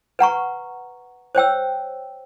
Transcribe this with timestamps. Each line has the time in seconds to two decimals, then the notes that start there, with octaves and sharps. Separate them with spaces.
0.19 B4 F#5 A#5 C#6
1.35 C5 C#5 G5 E6